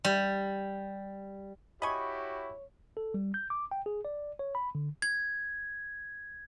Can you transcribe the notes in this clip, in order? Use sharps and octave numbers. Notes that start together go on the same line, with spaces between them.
G3
E4 F#4 G4 C#5 D#5 G#5 B5 C#6
A4
G3
G6
D6
G5
G#4
D5
C#5
B5
D3
G#6